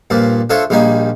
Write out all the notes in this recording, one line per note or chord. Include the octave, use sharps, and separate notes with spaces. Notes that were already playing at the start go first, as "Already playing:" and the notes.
G2 A#2 F3 D5
D4 F4 A4 C5 C#5 E5
A#1 G3 A#3 D#4 G#5